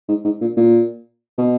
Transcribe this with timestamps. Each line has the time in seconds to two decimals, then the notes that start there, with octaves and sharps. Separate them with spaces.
0.09 G#2
0.24 G#2
0.41 A#2
0.57 A#2
1.38 B2